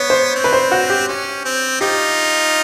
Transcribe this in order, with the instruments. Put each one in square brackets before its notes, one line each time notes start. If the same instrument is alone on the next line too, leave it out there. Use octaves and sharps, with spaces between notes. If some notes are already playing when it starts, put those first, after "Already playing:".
Already playing: [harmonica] B3 [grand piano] C#5
[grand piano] C5
[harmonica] C4
[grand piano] B4
C5
F#4
G4
[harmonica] C#4
C4
[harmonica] D#4 F4 [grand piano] G4